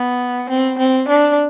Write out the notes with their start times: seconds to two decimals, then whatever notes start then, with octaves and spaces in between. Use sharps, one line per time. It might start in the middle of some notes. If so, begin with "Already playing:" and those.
Already playing: B3
0.50 C4
0.79 C4
1.09 D4